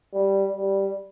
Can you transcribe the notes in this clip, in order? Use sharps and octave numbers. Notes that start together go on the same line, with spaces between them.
G3
G3